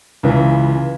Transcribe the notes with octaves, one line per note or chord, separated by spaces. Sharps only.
C#2 C#3 E3